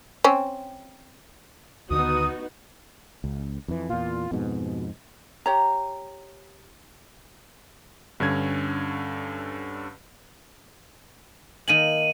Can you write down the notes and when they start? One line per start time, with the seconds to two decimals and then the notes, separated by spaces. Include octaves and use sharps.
0.24 C4 C#4
1.90 D2 D3 D#3 B3 D#4 F#4 D#6
3.24 C#2
3.68 F2 E3
3.89 E2 A#2 F4
4.31 F2 G#2 B2
5.46 G4 C#5 A#5
8.20 G2 D3 C#4 G#6
11.68 D#3 A#3 G#5 D#7 F#7